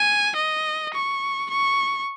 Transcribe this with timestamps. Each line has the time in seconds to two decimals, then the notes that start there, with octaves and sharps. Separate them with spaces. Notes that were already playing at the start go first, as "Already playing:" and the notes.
Already playing: G#5
0.36 D#5
0.94 C#6
1.51 C#6